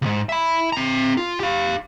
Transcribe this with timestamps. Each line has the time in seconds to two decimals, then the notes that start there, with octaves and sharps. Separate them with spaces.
0.02 C#2 G#2
0.29 E5 B5
0.73 C4 A#5
1.17 F4
1.40 G4 F5